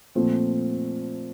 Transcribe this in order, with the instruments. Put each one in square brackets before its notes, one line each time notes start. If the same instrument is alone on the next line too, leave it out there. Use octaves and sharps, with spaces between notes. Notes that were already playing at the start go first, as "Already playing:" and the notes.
[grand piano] A#2 F3 A3 C4